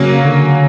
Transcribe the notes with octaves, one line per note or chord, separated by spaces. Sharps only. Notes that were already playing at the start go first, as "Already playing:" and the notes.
Already playing: C#3 F#3 A#3 C#4
D3